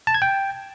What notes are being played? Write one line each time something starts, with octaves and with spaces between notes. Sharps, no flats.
A5
G#6
G5